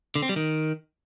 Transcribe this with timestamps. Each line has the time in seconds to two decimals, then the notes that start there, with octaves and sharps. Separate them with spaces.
0.15 D3
0.22 C4
0.29 G3
0.36 D#3